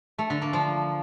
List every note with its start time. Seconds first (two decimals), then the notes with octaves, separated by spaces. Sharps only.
0.19 A3
0.30 D3
0.42 A#3
0.53 F3